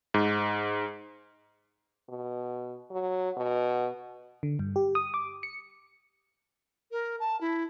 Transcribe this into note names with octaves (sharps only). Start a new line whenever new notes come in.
G#2
B2
F#3
B2
D3
G2
G4
D#6
D6
C#7
A#4
A5
E4